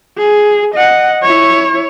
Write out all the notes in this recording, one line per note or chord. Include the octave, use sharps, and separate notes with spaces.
G#4
D#5 F#5
E4 C#5